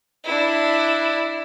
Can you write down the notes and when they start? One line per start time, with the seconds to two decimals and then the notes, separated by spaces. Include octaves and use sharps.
0.24 D4 E4